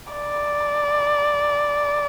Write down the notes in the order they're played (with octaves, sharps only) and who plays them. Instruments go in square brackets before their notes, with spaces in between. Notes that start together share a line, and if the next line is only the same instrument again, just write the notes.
[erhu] D5